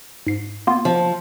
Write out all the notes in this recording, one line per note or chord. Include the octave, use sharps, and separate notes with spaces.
G#2 C7
A#3 B3 F4
F3